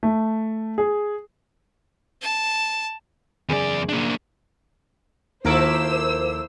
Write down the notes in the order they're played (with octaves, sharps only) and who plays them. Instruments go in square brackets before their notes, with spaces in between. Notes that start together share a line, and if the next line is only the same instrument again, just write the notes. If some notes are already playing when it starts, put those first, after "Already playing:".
[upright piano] A3
G#4
[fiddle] A5
[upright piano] F#1 G#4 [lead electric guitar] E2 D5
[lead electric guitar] A#3 D4
[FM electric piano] D#2 A#4 D6 [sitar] F3 E4 A4 [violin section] C5 E6